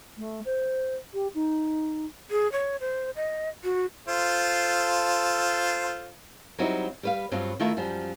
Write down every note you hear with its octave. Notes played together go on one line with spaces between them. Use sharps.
A3
C5
G4
D#4
G#4
C#5
C5
D#5
F#4
F4 A4 C5
F#3 G3 C4 D#4 E4 F#4
G3 B4 F5
G2 F#3 C4 F4
D#3 A3 E4 F4 A#4 E5
F#2 F3 G3